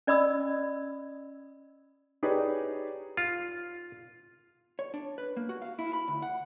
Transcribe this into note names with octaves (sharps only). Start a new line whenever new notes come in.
C#4 D5 D#5 B5 D#6 E6
D#4 G4 G#4 B4 C#5 D5
F4
C#5
D4
B4
A#3
F#4
F5
E4
B5
D2
F#5